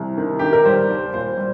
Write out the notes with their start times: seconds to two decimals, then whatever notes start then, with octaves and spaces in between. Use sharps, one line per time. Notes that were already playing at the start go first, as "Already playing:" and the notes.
Already playing: C2
0.18 D#3
0.39 D#3 G4
0.53 A#4
0.65 G3 C5
0.89 D#2
1.14 A#2 C5
1.37 G3